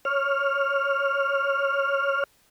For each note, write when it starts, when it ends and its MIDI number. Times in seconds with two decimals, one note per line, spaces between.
0.05 2.24 73
0.05 2.24 89